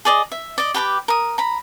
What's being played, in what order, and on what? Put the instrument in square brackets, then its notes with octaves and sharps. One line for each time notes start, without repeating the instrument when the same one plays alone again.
[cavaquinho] G#4 D5 D#5
E5
D5 D#5
G4 B4 A#5 D6
A#4 D#6
A#5 B5